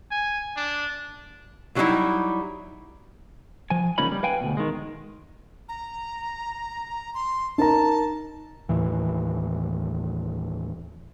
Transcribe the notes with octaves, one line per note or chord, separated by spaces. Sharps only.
G#5
D4
B2 F#3 G3 C#4 D#4 E4
F3 G#5
C#2 F3 A#3 C#4 D#4 B5
G3
B4 F5 G5 G#5
D2 B2
D#3 G#3
A#5
C6
D#4 A#4 A5 A#5
D#2 A2 E3